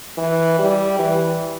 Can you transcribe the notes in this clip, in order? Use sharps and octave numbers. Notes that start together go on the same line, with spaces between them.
E3
G3
E3